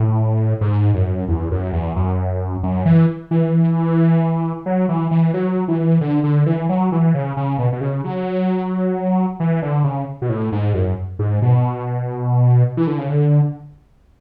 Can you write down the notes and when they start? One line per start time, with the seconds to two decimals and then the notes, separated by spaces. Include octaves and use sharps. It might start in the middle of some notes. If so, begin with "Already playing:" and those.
Already playing: A2
0.61 G#2
0.94 F#2
1.28 E2
1.51 F#2
1.73 E2
1.96 F#2
2.63 F#2
2.86 E3
3.31 E3
4.66 F#3
4.89 E3
5.11 E3
5.34 F#3
5.68 E3
6.01 D3
6.24 D3
6.46 E3
6.69 F#3
6.92 E3
7.14 C#3
7.37 C#3
7.59 B2
7.73 B2
7.81 C#3
8.04 F#3
9.40 E3
9.62 D3
9.84 C#3
10.22 B2
10.29 A2
10.52 G#2
10.74 F#2
11.19 G#2
11.42 B2
12.77 E3
12.87 D3
12.98 C#3
13.09 D3